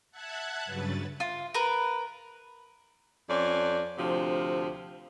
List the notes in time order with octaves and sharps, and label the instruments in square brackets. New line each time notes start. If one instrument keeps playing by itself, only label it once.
[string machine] E5 F#5 A5 F#6 G#6
G2 C#3 F#3 B4 A6
[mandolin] F4
A#4 B4
[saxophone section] F2 C#4 D5
D2 C3 F3